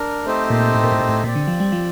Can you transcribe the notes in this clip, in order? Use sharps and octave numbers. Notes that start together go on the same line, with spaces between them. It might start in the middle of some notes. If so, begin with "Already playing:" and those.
Already playing: D4 A#4
A3 C4 D#4 G4 C5
A#2
A2
A#2
A2
A#2
A2
A#2 C4 G4 D5
D3
F3
G3
F3